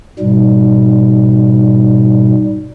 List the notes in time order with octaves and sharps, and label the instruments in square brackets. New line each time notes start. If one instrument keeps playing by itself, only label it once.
[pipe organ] G#2 B2 G3